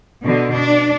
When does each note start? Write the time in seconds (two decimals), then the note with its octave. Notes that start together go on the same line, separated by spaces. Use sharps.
0.23 B2 D3
0.54 D4